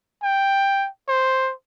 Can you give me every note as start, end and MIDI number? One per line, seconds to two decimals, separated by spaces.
0.23 0.88 79
1.08 1.52 72